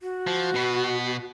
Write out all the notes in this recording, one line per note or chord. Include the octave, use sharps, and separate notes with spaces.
F#4
F3
B2 B3